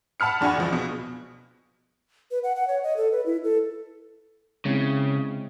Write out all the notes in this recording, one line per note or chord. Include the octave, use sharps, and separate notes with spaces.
F#5 A5 B5 F6 C#7
E2 D4 F#4 G#5 C#6
C#2 F3
B2
B4
F#5
F#5
C#5
D#5
A4
B4
E4
A4
C#3 G#3 C4 E4